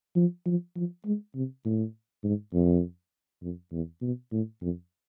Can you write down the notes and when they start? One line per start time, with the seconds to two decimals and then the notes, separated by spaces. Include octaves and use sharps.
0.16 F3
0.46 F3
0.76 F3
1.05 G#3
1.35 C3
1.65 A2
2.24 G#2
2.53 F2
3.42 F2
3.72 E2
4.02 B2
4.32 A2
4.61 F2